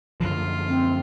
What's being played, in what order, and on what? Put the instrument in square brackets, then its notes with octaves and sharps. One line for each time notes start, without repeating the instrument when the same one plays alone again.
[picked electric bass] F#2 D3 F3 [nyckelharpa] F4
[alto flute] C4